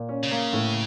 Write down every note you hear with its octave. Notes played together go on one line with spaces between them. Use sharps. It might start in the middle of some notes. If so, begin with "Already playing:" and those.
Already playing: A#2
C#4
C#3
A#3
A2